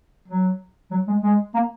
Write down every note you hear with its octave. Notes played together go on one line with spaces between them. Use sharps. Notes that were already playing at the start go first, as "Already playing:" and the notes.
F#3
F#3
G#3
G#3
A#3